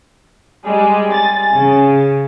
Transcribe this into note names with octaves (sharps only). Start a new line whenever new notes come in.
G3 G#3 G#5
A6
C#3